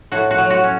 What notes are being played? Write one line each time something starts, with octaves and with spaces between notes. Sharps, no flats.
A2 F#4
F#4
F#3
F#4
C#4